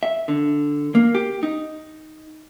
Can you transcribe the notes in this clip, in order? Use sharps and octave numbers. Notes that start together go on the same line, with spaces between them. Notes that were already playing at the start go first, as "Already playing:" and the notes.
E5
D3
A#3
G4
D#4